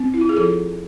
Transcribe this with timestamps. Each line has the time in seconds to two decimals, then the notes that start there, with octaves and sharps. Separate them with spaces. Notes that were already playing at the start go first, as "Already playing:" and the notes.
Already playing: C4
0.14 E4
0.21 F4
0.29 G#4
0.36 F3 F4 A4